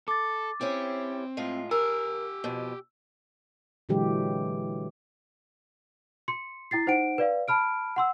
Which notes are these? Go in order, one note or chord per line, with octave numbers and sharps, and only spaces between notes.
A4 D6 A6
C4 C#4 E4 G4
A2 G#3 F4
G4 A#4 G#5 E6
F2 B2
A#2 D3 E3 F#3 G#3 G4
C6 C#7
E4 G5 A6 C7
D#4 C5 F#5 G5 D7
B4 D5 F5
A5 B5 F6 D7
F#5 C6 E6